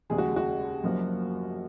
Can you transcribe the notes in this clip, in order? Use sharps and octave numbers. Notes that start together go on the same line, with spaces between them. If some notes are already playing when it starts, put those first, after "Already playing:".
F1 D#2 C#3 G#3 G#4
F#4
F#4
F#1 F#2 F3 A#3